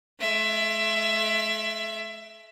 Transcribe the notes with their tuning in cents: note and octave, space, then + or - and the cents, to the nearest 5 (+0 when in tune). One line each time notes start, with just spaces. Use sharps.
A3 -45 E5 +20